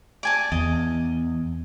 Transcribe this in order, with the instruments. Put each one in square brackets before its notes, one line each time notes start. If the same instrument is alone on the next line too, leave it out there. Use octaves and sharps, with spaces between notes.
[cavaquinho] D5 G#5 A5
[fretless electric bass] E2 [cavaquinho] D#5